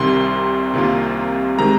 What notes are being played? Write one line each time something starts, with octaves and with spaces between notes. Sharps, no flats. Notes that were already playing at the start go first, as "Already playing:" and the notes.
Already playing: C2 C3 D#3 G3 C6
C2 C3 D#3 A#3 F4
C3 D#3 G#3 A#5